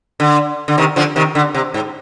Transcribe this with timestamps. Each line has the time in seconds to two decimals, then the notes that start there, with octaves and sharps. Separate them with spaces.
0.20 D3
0.68 D3
0.78 C3 D#3
0.96 D3 F3
1.16 C3 D#3
1.35 D3
1.54 C3
1.74 G#2